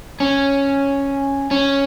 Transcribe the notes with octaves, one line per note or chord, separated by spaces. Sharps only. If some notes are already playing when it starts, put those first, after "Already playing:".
C#4
C#4